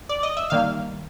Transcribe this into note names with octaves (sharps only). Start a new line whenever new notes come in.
D5
D#5
E5
D#3 G3 A#3 F5